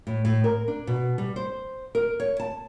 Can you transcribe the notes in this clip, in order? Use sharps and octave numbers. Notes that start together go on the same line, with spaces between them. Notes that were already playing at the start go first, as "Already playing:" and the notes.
A2
A2
A#4
D4
B2
G3
C5
A#4
C#5
A5